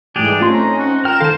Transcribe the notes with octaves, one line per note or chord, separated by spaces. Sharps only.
G#2 E3 G3 A3 D4 G4 G#4
A3 C4 C#4 D#4 F4 C6
A#5
F#4
A#4 G5 F6 E7
D#3 A4 C5 F5 A5